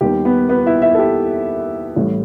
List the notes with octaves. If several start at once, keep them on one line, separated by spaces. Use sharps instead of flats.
D#2 D#3 G3 B3 D#4 G4
B3 B4
B3 B4
E4 E5
E4 E5
A4
G4
A1 A2 G3